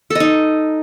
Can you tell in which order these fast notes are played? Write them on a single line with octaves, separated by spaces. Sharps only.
A4 D#5 D#4